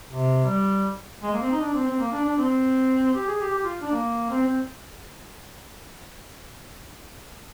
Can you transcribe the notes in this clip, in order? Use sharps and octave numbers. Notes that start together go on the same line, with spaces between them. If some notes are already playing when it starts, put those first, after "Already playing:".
C3
G3
G#3
A#3
C4
D#4
D4
C4
C4
A#3
D4
D4
C4
G4
G#4
G4
G4
F4
D4
A#3
C4
C4